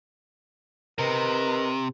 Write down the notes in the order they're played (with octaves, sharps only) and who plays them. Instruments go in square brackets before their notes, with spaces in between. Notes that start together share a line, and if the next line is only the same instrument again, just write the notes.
[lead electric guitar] C3 [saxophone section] D#4 A#4 B4